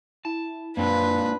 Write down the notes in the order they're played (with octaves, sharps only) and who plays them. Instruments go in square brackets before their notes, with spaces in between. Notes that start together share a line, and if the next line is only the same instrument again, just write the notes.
[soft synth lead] E4 [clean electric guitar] A5
[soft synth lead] F#2 [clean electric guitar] A#3 C4 F4 [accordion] D4 [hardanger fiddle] B4